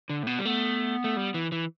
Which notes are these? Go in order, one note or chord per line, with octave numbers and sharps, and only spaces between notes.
D3
A2
B2
G3
A3 B3
A3
G3
E3
E3